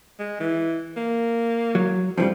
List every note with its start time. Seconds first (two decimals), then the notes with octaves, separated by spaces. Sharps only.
0.19 G#3
0.40 E3
0.97 A#3
1.75 F#3
2.18 F2 D#3 F3 G3